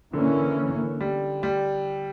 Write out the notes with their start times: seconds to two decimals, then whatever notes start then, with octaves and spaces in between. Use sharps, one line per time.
0.13 D3 E3 A#3 C#4
1.00 G3
1.43 G3